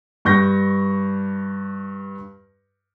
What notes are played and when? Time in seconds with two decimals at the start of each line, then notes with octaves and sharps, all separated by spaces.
0.25 G2 C#6 G6 A#6